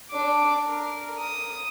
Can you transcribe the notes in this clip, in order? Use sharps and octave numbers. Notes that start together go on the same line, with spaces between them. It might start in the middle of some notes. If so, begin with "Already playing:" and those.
D4 D6
A#4
D#6